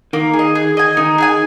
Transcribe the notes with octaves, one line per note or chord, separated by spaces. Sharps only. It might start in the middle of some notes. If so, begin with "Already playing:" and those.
D#3 A#3
G#4
D#5
G#4
D#5 G#5
D#3 D#4
G#4 D#5 G#5